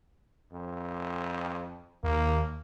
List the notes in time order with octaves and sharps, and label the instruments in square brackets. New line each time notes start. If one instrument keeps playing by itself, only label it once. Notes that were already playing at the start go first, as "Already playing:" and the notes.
[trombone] F2
[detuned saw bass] D#2 [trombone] A#3